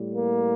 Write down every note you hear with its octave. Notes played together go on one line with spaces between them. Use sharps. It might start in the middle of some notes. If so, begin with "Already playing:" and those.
Already playing: A2 G3
A#3